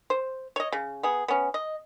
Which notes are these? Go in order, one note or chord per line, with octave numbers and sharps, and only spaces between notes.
C5
C#5 D#5
C#3
B3 G#4
B3 C#4
D#5